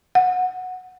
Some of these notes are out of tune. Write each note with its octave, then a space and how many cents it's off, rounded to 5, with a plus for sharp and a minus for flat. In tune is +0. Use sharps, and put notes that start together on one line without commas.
F#5 -10